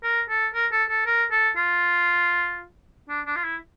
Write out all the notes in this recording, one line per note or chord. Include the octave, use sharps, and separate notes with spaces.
A#4
A4
A#4
A4
A4
A#4
A4
F4
D4
D4
F4
E4